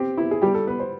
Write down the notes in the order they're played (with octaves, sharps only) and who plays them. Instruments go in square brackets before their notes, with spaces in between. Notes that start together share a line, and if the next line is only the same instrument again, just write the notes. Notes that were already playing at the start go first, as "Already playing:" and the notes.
Already playing: [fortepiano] C4 [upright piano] G4
[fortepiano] E4
[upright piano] G#4
[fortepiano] G3 [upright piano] G4
[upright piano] A4
[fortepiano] B3 [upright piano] B4
[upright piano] C5